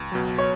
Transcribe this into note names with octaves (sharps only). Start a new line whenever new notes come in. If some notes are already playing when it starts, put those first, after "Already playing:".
Already playing: C#2
B2 F#3
C#5